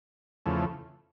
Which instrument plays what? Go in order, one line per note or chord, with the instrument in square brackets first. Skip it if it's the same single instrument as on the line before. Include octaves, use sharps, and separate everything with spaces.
[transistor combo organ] E2 C#3 F3 A3